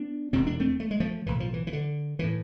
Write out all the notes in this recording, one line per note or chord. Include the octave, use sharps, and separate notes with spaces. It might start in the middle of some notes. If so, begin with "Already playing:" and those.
Already playing: B3 D4
E1 E2 C3 C4
D4
A3 C4
A3
G#3
F3 A3
B1 A2 E3
F3
E3
E3
D3
A2 E3